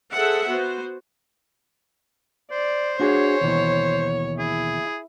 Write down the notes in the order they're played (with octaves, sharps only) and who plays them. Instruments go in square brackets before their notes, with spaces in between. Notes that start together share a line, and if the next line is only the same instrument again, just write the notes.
[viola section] G#4 A4 C5 E5 F#5
B3 F#4 C5
[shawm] C5 [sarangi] D5
[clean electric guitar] D4 F#4 G#4 [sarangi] C#5
[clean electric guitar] D#2 B2 E3
[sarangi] E4 [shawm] G#4